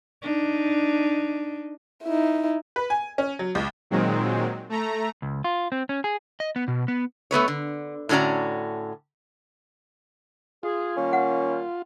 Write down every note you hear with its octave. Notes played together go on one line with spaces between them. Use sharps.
D4 D#4
D#4 E4
B4
G#5
C#4
F#3
C#2
A#2 D#3 F#3 G#3 C4
A3 A#5
C#2
F4
C4
C#4
G#4
D#5
B3
B2
B3
A3 B3 B4 C#5
D3
A2 D3 C#4 F#4 D5 A#5
F4 G#4
D#3 G3 A#3 C#4
F#5